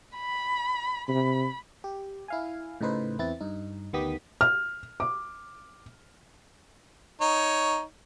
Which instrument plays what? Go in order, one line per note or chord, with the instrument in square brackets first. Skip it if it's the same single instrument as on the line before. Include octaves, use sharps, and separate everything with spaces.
[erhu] B5
[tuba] C3 [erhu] B5
[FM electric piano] G4
E4 F5 G#5
A2 C#3 D#4 B4 C5
E2 C4 E4 B4 A6
G2 D#4
D2 D#3 B3 G4 D#6 B6
[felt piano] F6
D6
[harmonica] D#4 C#5